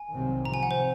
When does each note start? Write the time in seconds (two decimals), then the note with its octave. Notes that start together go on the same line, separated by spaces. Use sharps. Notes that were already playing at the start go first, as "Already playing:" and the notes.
Already playing: G#5
0.11 C2 C3 D#3 F#3 C4
0.45 C3 F3 C4 A#5
0.54 G#5
0.63 F#5
0.71 C5